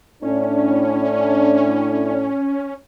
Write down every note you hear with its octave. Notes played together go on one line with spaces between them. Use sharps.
A2 C#4 D4